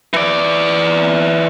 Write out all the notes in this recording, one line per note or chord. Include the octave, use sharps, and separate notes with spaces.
E3 D5